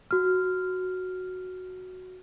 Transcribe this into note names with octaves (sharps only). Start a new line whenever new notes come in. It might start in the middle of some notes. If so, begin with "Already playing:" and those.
F#4 F6